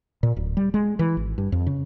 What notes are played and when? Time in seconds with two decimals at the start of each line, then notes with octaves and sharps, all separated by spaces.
0.23 A#2
0.36 D1
0.57 G3
0.74 G#3
0.99 E3
1.17 G#1
1.38 G2
1.52 F2
1.67 C#3